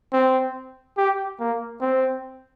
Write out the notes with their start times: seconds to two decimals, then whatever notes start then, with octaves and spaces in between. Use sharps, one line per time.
0.13 C4
0.98 G4
1.40 A#3
1.81 C4